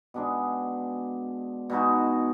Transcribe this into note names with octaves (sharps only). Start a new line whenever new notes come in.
B2 G#3 D4 G#4
B2 G#3 D#4 F#4